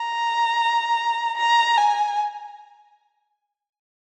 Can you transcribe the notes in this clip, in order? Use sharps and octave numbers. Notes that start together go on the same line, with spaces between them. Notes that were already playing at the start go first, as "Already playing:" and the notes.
Already playing: A#5
A#5
G#5